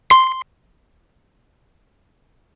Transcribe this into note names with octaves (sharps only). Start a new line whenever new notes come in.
C6 C7